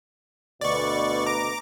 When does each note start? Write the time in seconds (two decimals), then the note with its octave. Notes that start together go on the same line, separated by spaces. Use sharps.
0.61 D2 B2 D5 C#6
1.26 A#5 D6